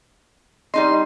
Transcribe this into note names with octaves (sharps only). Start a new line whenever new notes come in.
G3 D#4 D#5 C6